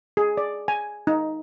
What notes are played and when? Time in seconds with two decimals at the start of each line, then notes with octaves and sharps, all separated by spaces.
0.17 G#4
0.37 D5
0.68 G#5
1.07 D#4